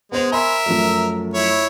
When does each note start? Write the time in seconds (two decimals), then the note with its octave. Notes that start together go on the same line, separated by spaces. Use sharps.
0.12 G#3 B3 C5 F7
0.32 A#4 E5 G#5 B5 C6
0.66 F#2 F3 A3
1.34 E4 C#5